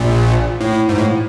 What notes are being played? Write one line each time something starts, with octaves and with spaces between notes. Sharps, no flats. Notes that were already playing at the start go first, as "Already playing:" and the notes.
Already playing: A#1 A#2
A2
G#2
A2